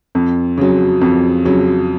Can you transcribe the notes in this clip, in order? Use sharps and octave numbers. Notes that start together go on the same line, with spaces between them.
F2
C#3 F#3
F2
C#3 F#3